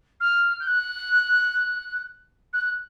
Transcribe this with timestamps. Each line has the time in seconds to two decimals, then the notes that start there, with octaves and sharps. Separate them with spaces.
0.20 F6
0.60 G6
0.67 F#6
2.53 F#6